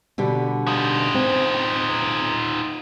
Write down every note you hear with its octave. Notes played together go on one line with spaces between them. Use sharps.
B2 D3 G3
D#4 F4
C4